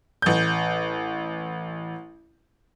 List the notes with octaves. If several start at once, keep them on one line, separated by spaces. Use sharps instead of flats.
A1 G6